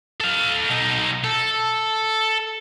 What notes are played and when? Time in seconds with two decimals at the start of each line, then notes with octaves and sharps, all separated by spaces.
0.20 A4 F5
0.70 B2 D#4
1.24 A4